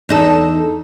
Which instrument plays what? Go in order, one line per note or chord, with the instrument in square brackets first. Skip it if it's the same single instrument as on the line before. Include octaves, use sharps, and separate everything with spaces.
[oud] E2 D#4 A4